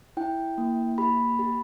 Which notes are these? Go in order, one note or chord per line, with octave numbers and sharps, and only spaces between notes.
E4 G5
A#3
G4 B5
G4